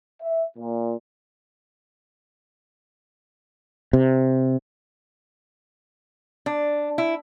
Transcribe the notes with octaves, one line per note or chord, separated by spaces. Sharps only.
E5
A#2
C3
D4
E4